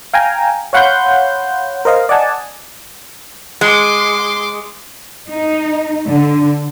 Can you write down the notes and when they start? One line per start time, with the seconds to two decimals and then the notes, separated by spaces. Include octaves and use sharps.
0.13 F5 G5 G#5 A#5
0.73 C#5 F5 F#5 B5 C6 G6
1.85 A#4 C5 D#5 F5
2.09 D5 D#5 F#5 G#5 A5
3.61 G#3 C6 D6
5.30 D#4
6.07 D3